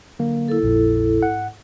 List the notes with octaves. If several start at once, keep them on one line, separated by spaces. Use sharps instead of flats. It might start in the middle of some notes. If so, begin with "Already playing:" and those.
D3 F#3 A#3
E4 A4
A#1 F2 A#2
G#2 F#5